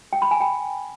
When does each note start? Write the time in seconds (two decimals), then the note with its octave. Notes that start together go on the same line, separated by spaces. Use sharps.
0.13 G5
0.22 B5
0.31 G#5
0.40 G5